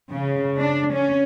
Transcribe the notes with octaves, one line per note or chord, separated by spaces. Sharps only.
C#3
D4
C#4